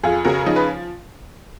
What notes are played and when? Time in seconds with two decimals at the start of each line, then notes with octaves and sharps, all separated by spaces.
0.03 F2 F4 G#4
0.25 C#3 F#4 A#4
0.46 F3 D#4
0.56 B4